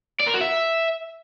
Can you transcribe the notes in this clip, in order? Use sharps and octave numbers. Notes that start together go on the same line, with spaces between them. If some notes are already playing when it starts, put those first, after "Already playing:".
D5
A#4
F#4
E5